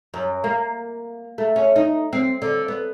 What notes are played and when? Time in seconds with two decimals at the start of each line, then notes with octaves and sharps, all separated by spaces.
0.14 F#2
0.44 A#3
1.38 A3
1.56 C#4
1.76 D#4
2.13 C4
2.42 D3
2.68 B3